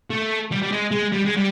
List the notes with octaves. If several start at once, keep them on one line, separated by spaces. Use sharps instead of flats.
A3
G3
G3
G#3
G#3
G3
G#3
G3